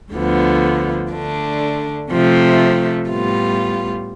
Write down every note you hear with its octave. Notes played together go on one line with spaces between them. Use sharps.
D2 D3 F3 B3
D3 A3 D4
C3 F3 A3
A2 G3 B3 F4